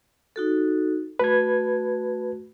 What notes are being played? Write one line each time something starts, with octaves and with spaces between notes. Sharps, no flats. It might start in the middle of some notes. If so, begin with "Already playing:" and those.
D#4 F#4 A4
A3 F#4 B4 G#6